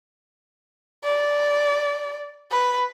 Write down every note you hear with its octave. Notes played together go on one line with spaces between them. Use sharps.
D5
B4